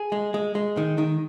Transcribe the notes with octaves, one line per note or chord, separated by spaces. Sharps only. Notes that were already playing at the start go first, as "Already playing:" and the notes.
Already playing: G#4
G#3
G#3
G#3
D#3
D#3